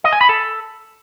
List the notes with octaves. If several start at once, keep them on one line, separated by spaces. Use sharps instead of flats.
D#5
G#5
B5
A4